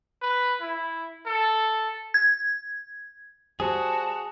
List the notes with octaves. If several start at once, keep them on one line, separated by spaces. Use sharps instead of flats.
B4
E4
A4
G#6
G3 F#4 G#4 C5 A5